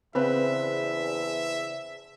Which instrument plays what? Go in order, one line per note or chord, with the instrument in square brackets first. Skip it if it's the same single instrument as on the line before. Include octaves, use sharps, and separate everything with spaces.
[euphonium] E2 [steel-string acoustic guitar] C#3 C4 D4 [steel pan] B4 [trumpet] E5